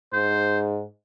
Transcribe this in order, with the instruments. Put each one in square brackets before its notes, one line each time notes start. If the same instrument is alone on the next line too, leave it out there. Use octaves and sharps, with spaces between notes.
[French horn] G#2 [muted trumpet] C5